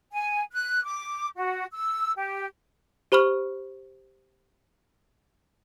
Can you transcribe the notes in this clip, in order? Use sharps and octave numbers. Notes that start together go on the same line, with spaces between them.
G#5
F#6
D6
F#4
E6
G4
G4 C5 B5 C#6 F6